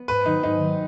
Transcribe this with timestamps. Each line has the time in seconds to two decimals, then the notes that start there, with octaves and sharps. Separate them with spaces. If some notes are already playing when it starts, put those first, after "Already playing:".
Already playing: B3
0.08 G#2 B4
0.26 D#3 F#3 D#4
0.43 G#2 D#4
0.61 D#3 F#3